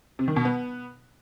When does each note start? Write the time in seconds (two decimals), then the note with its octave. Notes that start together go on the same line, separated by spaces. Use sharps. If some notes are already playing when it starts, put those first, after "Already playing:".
0.19 C3
0.28 D#3
0.36 B2
0.45 B3